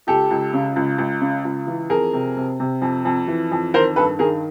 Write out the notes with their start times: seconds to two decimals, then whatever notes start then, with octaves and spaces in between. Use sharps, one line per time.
0.07 C#2 G4 A4
0.31 C#2
0.53 C#3
0.76 C#2
0.98 C#2
1.21 C#3
1.45 C#2
1.67 E3
1.90 F2 G#4 A#4
2.13 C3
2.37 C3
2.60 C3
2.82 F2
3.05 F2
3.28 E3
3.51 F2
3.74 D#3 A#4 C5
3.96 G2 A4 B4
4.19 D#3 G#4 A#4